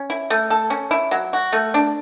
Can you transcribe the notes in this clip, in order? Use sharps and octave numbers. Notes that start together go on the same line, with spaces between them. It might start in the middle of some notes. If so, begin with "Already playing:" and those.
Already playing: C#4
E4
A3
A4
C#4
E4
F#3
F#4
A3
D4